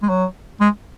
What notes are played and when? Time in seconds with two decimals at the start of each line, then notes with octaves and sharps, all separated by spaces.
0.03 G#3
0.09 F#3
0.61 G#3